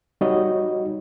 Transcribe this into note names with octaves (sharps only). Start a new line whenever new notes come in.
G3 D#4 F#4 C#5 D#5